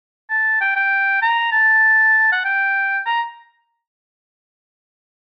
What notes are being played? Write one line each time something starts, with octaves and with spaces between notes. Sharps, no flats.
A5
G5
G5
A#5
A5
F#5
G5
A#5